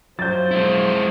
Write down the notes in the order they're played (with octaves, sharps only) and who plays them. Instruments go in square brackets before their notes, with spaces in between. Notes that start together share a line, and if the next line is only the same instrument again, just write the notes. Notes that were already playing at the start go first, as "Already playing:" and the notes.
[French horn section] F3 C5 [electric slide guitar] F#3 [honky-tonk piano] G6 A6
[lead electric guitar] G#3 E4